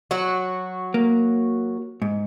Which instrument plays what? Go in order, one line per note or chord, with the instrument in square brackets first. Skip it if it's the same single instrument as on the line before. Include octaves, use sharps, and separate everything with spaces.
[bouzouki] F#3 F#4
[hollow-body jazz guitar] A#3
G#2